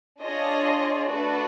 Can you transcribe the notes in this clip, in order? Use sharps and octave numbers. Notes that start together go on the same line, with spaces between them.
D4 F4 G#4 C#5 D#5
A3 D4 F#4 B4